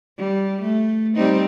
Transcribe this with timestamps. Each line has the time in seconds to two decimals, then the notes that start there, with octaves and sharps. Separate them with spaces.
0.18 G3
0.62 A3
1.15 G3 C4 D#4